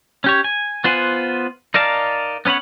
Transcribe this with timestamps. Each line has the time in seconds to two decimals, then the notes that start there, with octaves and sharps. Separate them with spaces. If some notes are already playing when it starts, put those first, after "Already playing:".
0.24 C#4 G4 C#5
0.44 G#5
0.84 B3 F4 C5 F#5 G#5
1.74 D#4 A#4 D5 F5 A5
2.45 B3 C#4 B4 C#5 F#5